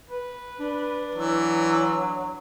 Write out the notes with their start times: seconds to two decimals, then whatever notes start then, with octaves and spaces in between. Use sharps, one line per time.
0.10 B4
0.60 D4
1.15 E3 F#3